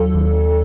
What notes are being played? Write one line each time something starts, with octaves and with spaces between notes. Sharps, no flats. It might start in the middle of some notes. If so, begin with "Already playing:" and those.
Already playing: D#2 F#3 A4
D#2